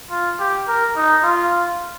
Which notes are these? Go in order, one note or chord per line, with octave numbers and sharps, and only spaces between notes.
F4
G4
A#4
D#4
F4